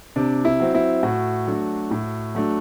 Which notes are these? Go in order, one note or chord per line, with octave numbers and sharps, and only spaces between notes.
C3 D4
E4
F#3 C4
E4
A2 F#4
F#3 A3 D4
A2
F#3 A3 D4